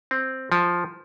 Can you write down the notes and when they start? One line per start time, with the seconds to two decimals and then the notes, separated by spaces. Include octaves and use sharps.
0.11 C4
0.52 F3